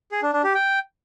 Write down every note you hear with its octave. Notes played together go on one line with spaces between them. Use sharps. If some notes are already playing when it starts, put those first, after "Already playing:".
G#4
D4
D4
G4
G5